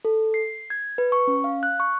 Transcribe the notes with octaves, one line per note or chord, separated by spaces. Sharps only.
A4
C7
G#6
B4
C#6
C#4
F5
F#6
C#6